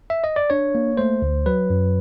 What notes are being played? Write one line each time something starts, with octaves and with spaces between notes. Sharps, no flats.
E5
D#5
D5
D4 C#5
A#3
A3 C5
D2
F#3 B4
F#2